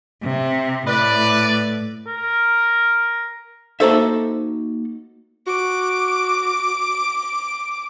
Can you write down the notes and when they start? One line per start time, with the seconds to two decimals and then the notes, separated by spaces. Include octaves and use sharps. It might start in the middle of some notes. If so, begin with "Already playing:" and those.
0.23 C3
0.87 A2 B4 D5
2.06 A#4
3.80 A#3 D#4 F#4 A4 C5 E5
5.47 F#4 D6